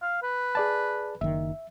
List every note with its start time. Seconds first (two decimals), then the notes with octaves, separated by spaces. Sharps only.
0.02 F5
0.23 B4
0.55 G#4 D5 A5
1.21 F#1 D#3 E5